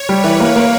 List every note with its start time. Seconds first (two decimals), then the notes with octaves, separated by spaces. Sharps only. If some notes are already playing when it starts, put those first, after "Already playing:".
Already playing: C#5
0.09 G3
0.24 E3 B4
0.40 A#3
0.56 A#3